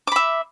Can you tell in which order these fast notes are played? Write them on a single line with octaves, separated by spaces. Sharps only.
D6 B5 E5